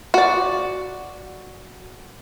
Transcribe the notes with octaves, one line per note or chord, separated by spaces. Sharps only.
F#4 D5